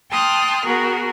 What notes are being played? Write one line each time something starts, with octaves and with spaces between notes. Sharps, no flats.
G5 A5 C6 D#6 F6 F#6
B3 F#4 G#4 A#4